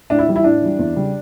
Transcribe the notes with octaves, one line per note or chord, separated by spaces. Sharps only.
A2 D4
E4
E3 G3
E4
A2 D4
E3 G3
E2
C#3 G3